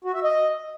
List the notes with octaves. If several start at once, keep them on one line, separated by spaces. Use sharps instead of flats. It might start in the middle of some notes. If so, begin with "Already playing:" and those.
F#4
E5
D#5